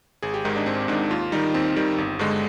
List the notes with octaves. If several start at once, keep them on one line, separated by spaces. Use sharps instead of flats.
G#1 G#4
G4
G#2 D#3 D#4
D4
G#1 C4
G#2 D#3 D4
D#2 F4
D#3 G3 D#4
D#2 C4
D#3 G3
G1
G2 D3 G#3